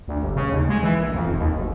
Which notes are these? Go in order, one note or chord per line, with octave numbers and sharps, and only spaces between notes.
D2
G1
C#3
D#2
G#3
E3
A#1
F2
D#1
D#2
F#1